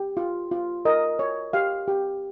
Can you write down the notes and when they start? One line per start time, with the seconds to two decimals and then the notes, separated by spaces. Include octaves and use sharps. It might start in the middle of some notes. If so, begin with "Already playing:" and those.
Already playing: G4
0.17 F4
0.51 F4
0.85 A#4 D#5
1.19 C#5
1.53 G4 F5
1.88 G4